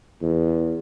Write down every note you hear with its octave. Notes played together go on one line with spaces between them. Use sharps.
E2